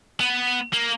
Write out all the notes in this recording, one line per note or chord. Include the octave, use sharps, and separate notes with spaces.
B3
A#3